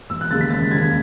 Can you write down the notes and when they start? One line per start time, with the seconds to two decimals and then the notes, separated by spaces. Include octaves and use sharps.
0.10 E1 E6
0.21 F#6
0.31 D#2 C#3 G#3 A6
0.41 B6
0.50 E1 A6
0.71 D#2 C#3 G#3 G#6